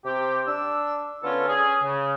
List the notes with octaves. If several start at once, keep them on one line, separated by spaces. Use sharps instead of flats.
C3 G4
D4 E6
D3 B3 C#4 F4 A4
C#4 G#4
C#3